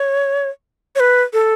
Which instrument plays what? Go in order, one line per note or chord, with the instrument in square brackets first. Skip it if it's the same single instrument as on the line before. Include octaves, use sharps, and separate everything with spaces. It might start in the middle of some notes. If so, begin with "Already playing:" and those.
Already playing: [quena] C#5
C#5
B4
A4